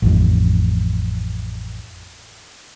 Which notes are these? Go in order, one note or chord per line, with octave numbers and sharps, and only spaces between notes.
A1 F2